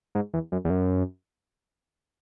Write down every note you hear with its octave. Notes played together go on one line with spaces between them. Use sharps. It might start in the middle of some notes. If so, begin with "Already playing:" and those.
G#2
E2
F#2
E2
F#2